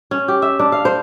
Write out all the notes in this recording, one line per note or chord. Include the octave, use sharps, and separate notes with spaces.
C#4
G4
E5
D4
F5
C5